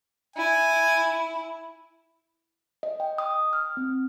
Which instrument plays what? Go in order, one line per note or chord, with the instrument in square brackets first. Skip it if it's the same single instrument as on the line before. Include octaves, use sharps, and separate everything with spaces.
[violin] E4 [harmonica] G#5
[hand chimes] D#5
G5
D#6
F6
C4